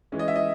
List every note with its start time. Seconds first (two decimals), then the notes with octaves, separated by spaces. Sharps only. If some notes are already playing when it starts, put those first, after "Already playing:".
0.12 E3 G#3 C#4
0.19 D#5
0.28 E5
0.36 D#5